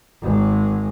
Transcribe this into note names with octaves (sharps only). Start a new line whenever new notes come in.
G#1 G#3